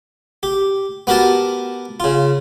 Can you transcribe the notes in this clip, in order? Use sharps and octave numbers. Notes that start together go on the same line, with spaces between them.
G4
B3 F#4 G4 A#4 A5
C#3 F4